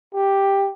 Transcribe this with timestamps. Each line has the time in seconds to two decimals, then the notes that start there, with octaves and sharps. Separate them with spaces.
0.14 G4